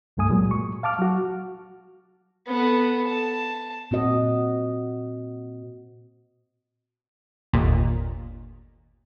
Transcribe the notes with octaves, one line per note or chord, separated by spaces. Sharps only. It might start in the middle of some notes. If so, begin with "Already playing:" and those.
C#2 G2 A3 G#5 D#6
A#2 F#3 G#3
C#6
F5 A5 D6 F6
F#3 F#4
B3 A4
A5
A#2 C4 F#4 D#5
G1 D#2 A#2